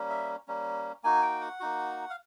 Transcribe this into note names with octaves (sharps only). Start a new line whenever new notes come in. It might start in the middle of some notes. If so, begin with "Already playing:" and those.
Already playing: G3 A#3 C#4
E5
G3 A#3 C#4
A#3 D#4 F#4 G#5
G5
F#5
A#3 D#4 F#4
F5